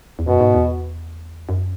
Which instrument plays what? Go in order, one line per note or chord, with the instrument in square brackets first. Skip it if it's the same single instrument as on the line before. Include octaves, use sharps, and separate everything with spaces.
[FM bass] E2
[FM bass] F#2 [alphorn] B2
[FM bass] G#2
E2
F#2